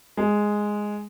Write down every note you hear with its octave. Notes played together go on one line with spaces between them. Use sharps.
G#3